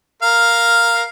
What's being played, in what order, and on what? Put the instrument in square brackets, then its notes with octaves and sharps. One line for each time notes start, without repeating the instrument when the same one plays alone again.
[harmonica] A#4 F5